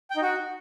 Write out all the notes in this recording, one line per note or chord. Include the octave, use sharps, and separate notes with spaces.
G5
D#4
F#4